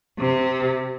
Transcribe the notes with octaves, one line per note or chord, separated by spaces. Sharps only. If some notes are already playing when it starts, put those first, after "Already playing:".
C3